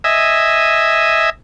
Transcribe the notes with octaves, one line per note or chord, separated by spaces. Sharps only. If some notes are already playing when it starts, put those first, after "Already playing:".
D#5 E5 G#5